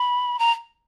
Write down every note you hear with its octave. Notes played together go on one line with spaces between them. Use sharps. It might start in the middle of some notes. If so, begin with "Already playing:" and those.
Already playing: B5
A#5